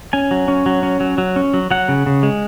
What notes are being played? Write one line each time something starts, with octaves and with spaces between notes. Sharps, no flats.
C#4 G#5
F#3
C#4
F#3
C#4
F#3
F#3
C#4
F#3
F#3 F#5
C#3
C#3
G#3